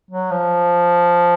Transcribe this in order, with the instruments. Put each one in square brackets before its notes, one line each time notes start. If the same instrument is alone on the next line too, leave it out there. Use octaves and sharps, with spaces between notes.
[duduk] F#3
F3